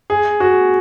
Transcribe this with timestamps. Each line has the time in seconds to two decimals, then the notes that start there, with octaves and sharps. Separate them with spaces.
0.10 G#4
0.40 F#4